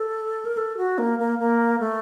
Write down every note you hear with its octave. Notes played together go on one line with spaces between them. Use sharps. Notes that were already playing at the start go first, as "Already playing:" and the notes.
Already playing: A4
A#4
A4
F#4
A#3
A#3
A#3
A3